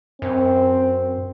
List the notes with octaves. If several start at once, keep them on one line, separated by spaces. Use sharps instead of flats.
F#2 C4